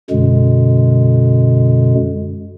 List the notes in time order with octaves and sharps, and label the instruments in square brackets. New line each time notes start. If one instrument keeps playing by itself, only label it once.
[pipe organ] F#2 B2 D3 G#3